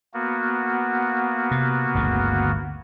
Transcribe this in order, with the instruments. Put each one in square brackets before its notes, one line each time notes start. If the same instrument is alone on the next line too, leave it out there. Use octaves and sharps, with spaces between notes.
[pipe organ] A#3 B3 F#4
[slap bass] C3
G1 D2 C#3